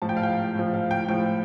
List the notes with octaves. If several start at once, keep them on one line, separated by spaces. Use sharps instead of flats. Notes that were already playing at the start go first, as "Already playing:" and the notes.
A2 F3 A5
G5
F5
G5
A2 F3
F5
G5
A2 F3 G5